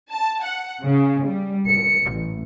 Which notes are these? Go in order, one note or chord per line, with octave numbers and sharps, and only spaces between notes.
A5
F#5
C#3
G3
C#7
A1